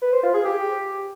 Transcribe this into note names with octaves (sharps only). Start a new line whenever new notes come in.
B4
C5
F4
G#4
G4